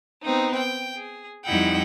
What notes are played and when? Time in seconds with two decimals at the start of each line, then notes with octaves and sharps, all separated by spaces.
0.23 B3 C4 D#4
0.55 G5
0.97 G#4
1.45 F2 G3 D#4 E4 F#5 G5